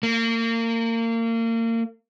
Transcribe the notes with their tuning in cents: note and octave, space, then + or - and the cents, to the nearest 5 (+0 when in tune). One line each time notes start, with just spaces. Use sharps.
A#3 -30